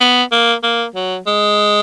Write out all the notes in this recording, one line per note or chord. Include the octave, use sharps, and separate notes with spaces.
B3
A#3
A#3
F#3
G#3